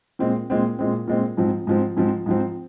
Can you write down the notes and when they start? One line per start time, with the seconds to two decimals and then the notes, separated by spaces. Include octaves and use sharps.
0.19 A#2 G#3 C4
0.50 A#2 G#3 C4
0.79 A#2 G#3 C4
1.08 A#2 G#3 C4
1.37 G#2 F3 C4
1.67 G#2 F3 C4
1.97 G#2 F3 C4
2.26 G#2 F3 C4